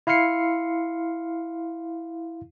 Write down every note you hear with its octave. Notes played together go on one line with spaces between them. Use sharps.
E4 F5 C6 F6 C7 C#7